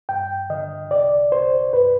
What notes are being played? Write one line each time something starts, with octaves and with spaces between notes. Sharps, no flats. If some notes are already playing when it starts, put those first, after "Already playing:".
G2 G5
D3 D#5
C2 D5
C2 C5
G2 B4